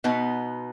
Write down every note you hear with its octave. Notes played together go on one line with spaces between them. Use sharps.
B2 B3 D#4